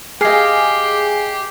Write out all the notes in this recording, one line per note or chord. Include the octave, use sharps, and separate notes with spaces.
G4 G#4 D#5 F5 G#5 C7